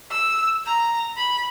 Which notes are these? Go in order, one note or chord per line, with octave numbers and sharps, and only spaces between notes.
E6
A#5
B5